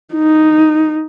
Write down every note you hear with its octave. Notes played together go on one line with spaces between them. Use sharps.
D#4